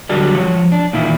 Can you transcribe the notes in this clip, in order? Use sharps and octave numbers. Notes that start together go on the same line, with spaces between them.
D3 F#3 G3 D4 A#4
F3 C#5
D4
A#2 D#3 E3 A#3 E4